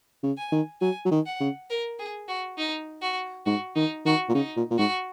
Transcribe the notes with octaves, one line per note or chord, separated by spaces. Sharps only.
C#3
G#5
D#3
F#3 G#5
F#3
D#3
F#5
C#3
A#4
G#4
F#4
D#4
F#4
G#2 F#4
D#3 D#4
D#3 F#4
A#2
C#3 D#4
A#2
A#2
G#2 F#4